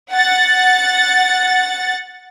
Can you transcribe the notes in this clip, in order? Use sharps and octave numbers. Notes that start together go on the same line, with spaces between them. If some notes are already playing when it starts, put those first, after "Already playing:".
F#5 A6